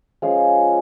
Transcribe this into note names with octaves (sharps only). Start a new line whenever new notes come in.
F3 G#3 C#4 F4 F5